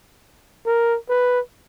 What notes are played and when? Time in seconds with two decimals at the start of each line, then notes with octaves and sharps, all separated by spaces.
0.66 A#4
1.09 B4